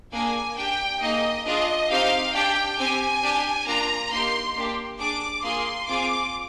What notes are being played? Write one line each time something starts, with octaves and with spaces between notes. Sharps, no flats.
A#3 D4 G#4 G#5
D4 G4 G5
A#3 D#4 G#4 D#5
D4 F4 G#4 D#5
C4 D#4 G4 F5
D4 G4 G5
C4 G4 G#5
D4 G4
A#3 D4 F4 A#5
A#3 D#4 G4 C6
A#3 D4 G4
D4 G#4 D6
A#3 F4 G#4 C6
C4 F4 G#4 D6